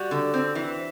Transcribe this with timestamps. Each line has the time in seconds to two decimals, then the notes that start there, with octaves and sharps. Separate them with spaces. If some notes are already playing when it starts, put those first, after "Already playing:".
Already playing: G3 F#4
0.11 D3
0.34 C4
0.55 E3